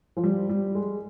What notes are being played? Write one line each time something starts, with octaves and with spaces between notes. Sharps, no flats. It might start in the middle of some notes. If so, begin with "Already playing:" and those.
F3
G3
G3
G#3